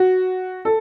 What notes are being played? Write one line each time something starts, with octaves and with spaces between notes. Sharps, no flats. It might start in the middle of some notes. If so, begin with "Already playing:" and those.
Already playing: F#4
A4